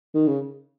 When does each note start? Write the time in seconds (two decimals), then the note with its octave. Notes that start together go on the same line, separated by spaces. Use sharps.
0.15 D#3
0.28 C#3